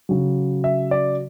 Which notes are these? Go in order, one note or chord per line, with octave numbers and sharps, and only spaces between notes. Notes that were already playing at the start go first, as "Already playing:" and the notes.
C#3 F#3
E5
D5